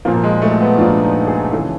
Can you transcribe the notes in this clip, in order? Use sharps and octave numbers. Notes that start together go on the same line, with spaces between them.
A#2 F3 A#3
G#3
A3
B3
A#2 F3 D4
D#4
G#4
C#3 E3 A4